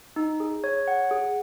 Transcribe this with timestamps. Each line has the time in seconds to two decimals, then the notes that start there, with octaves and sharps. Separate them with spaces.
0.16 D#4
0.40 G#4
0.64 C#5
0.88 F#5
1.11 G#4